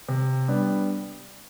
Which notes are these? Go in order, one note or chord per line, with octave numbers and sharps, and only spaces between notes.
C3
G3 B3 D4